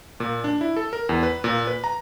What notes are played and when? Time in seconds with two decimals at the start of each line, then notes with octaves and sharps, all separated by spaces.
0.20 A#2
0.44 D4
0.61 E4
0.76 A4
0.93 A#4
1.09 E2
1.23 B4
1.44 A#2
1.67 B4
1.84 A#5